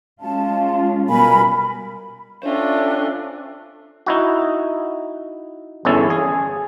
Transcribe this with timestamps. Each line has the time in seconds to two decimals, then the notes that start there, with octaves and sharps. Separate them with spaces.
0.21 G#3 C#4 F4 A5
1.08 B2 G3 A#4 G#5 B5
2.43 C#4 D4 F4 A4 C5 D5 E5
4.06 D#4 E4 F#4
5.85 G1 E2 C#4 E4 A4
6.10 G#4